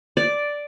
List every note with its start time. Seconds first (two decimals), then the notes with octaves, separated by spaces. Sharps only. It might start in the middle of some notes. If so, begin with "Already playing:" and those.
0.17 D5